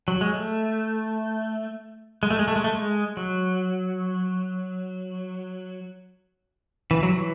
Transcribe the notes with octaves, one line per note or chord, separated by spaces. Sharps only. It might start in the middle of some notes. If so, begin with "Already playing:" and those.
F#3
G#3
A3
G#3
A3
G#3
A3
G#3
A3
G#3
F#3
E3
F#3
E3